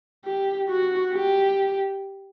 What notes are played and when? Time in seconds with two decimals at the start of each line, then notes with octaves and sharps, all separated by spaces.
0.25 G4
0.69 F#4
1.14 G4